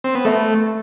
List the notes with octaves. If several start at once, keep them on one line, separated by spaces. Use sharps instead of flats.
C4
B3
A3 A4 E5 B5